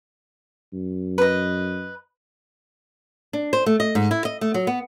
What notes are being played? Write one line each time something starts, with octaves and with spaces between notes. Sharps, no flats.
F#2
B4 D#5
D4
C5
A3
D#5
G#2
E4
D#5
A3
F#3
B3